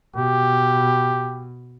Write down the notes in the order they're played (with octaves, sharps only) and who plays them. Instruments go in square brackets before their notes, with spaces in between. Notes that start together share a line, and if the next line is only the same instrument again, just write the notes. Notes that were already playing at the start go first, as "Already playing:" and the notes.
[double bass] B2 [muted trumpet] G4